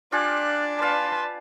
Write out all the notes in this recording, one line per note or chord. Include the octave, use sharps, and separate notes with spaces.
D4 F4 G4 G#5 F#6
B4 D5 F5 A5 C6